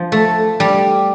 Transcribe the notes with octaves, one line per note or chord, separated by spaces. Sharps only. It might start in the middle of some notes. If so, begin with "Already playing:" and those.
Already playing: F3
A3
G3